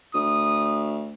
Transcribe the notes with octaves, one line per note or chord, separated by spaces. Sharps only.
D2 D#6